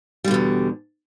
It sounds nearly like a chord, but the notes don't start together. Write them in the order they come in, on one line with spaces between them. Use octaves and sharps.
G3 D3 B2 E2